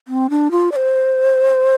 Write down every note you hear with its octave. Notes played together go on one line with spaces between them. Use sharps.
C4
D4
F4
D5
C5